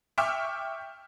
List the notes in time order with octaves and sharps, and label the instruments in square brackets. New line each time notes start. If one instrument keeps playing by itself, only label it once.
[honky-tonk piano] E5 G5 C#6 D6 E6 F6